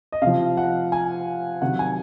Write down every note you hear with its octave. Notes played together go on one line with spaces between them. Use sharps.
D#5
C3 F3 F5
F#5
G#5
C3 D#3 F#3 F#5
G#5